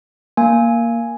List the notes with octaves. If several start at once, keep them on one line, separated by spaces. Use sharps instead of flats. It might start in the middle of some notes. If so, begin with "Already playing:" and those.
A#3 G#5